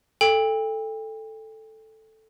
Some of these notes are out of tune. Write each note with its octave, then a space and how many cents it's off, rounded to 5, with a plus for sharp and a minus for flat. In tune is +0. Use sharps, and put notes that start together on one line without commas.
A4 +0 G5 +35